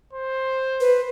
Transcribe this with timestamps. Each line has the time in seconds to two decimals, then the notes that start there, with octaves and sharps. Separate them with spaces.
0.13 C5
0.80 B4